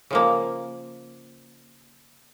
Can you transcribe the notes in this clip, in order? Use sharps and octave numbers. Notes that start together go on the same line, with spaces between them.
C#3 F3 A#3